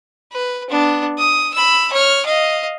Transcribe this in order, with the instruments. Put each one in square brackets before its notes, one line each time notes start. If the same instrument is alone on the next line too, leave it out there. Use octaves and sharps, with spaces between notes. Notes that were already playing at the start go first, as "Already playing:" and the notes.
[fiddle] B4
B3 D4
D#6
B5 E6
C#5 F6
D#5 F5